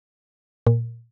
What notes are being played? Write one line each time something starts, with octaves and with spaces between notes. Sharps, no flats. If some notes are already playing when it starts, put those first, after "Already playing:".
A#2